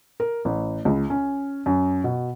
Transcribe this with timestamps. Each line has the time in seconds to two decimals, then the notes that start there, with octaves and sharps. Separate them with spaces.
0.20 A#4
0.45 A1
0.85 C#2
1.10 C#4
1.66 F#2
2.04 B2